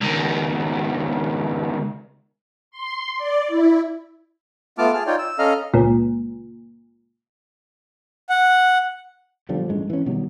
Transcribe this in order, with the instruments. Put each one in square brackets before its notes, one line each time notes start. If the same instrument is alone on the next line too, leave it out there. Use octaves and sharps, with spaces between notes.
[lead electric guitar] C#2 D#3
[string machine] C6
D5
E4
[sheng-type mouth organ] A3 B3 F4 A5 D6 F6
G#4 A5 F6
D#4 F4 C#5 D5 G5
E6
C#4 A4 D#5 F5 A#5 F6
[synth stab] C#2 A#2
[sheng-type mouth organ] F#5
[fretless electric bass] B1 D3 F3 G3
A1 G2 G#3
E3 C#4
B2 D#3 F#3 G3